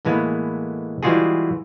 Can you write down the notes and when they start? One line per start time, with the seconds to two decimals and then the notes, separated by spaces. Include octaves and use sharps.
0.05 A2 E3 G#3 A#3 B3
1.03 E3 G3 G#3 F4 F#4 G#4